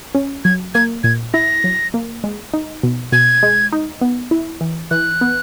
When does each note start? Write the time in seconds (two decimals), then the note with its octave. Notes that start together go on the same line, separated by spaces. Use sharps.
0.15 C#4
0.45 F#3 G#6
0.74 A#3 G#6
1.04 A#2 G#6
1.34 E4 A#6
1.64 F#3
1.94 A#3
2.24 G#3
2.54 D#4
2.83 B2
3.12 B2 G#6
3.43 G#3
3.73 D#4
4.01 B3
4.31 E4
4.61 E3
4.91 E3 F#6
5.21 B3